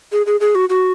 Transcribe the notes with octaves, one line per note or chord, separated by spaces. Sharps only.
G#4
G#4
G#4
F#4
F#4